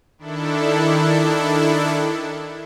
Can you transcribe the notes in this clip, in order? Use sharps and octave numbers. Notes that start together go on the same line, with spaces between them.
D#3 D4 E4 A4